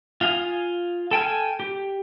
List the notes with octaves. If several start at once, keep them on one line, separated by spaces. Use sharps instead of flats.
F4 F5 G#5 D#6
A4 G5 G#5 F6
G4